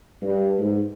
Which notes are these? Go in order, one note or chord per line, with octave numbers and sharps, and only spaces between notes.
G2
G#2